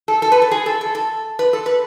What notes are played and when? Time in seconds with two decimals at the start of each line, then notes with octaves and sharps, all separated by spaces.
0.08 A4
0.22 A4
0.32 B4
0.42 A4
0.51 G#4
0.66 A4
0.81 A4
0.95 A4
1.39 B4
1.53 A4
1.66 B4